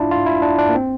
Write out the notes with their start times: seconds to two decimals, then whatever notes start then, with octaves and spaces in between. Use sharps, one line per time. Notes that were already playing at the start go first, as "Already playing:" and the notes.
Already playing: D4 E4 F4
0.11 F4
0.26 E4
0.42 D4
0.58 D4
0.69 A#3
0.75 C4